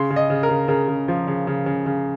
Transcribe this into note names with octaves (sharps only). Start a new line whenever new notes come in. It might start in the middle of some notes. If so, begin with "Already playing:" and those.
Already playing: C#3 C6
C#3
D#5
C#3
A#4
C#3
C#3 A#4
C#3
F3
C#3
C#3
C#3
C#3